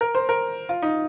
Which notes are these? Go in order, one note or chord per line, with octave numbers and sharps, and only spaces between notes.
A#4
C5
A#4
F4
D#4